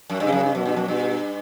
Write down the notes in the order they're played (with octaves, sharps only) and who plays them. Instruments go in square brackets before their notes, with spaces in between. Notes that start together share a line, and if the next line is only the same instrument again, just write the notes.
[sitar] F#2
G2
[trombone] C#3
[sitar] F#2
G2
[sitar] F#2 [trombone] B2
[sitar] G2
F#2
[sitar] G2 [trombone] B2